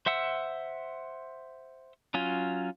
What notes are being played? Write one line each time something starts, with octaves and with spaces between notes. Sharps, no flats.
C5 E5 F#5 E6
F#3 C#4 F4